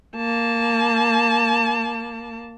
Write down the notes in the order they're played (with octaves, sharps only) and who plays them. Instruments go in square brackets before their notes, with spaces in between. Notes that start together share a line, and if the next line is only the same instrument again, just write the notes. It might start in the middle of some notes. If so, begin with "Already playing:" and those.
[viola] A#3 A5